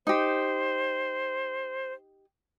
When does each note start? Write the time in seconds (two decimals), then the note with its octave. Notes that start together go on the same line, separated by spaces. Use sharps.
0.07 D#4 G4 C5